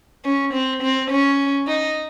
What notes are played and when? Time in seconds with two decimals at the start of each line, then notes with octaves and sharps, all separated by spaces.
0.25 C#4
0.53 C4
0.82 C4
1.11 C#4
1.67 D#4